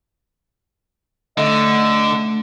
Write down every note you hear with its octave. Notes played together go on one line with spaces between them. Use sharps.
D3 A3 D#5